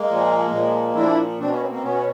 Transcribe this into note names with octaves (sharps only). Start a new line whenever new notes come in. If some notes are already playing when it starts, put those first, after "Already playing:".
Already playing: G#3 A#3
A#2 F3
A#2 F3
A#2 F3 D4 E4
B2 C4 D4
B3 C#4
A#3 C4
A#3 C4
B2 B3 C#4